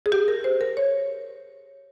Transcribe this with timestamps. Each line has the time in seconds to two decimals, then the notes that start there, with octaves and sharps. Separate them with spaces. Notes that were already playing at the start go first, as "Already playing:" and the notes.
0.06 G#4
0.12 G4
0.28 A#4
0.44 C5
0.61 A#4
0.77 C#5